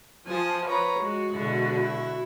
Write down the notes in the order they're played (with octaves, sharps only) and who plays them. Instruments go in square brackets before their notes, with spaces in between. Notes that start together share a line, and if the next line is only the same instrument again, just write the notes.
[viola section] F3 [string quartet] G#5 A5 D#6
[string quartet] B4 C#5 A#5
[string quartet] G#3 [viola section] F#4
[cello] B2 D3 [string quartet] G#3 E4
[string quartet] E4